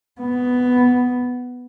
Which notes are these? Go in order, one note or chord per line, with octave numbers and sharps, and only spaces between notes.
B3